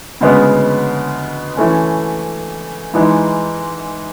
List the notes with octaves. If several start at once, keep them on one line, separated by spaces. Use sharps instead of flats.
D2 C#3 G#3 B3
E3 A3 C#4
G#2 E3 G#3